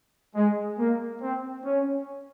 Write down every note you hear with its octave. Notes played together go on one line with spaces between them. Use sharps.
G#3
A#3
C4
C#4